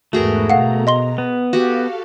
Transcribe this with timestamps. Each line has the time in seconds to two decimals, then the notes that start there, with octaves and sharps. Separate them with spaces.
0.13 E2 G#2 A3 F#4 G#4 A#4 B4
0.50 B2 A4 F5 F#5 A#5
0.87 D#5 C6 G7
1.18 B3
1.53 F#4 G4 A4 F5